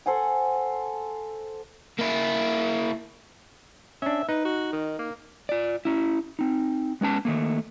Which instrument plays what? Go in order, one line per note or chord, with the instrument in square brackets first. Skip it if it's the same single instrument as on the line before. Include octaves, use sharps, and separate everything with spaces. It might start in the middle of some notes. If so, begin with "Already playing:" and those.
[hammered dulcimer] A4 C5 F#5 G#5
[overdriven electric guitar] A#3 E4
[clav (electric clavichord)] C#4 D4 [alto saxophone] E5
[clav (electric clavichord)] D#4 [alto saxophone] B4
[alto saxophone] F#4
D#3
A#3
[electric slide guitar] F4 D5
C#4 E4
C4 D#4
G#3 B3 C#4 A5
D#3 A3 A#3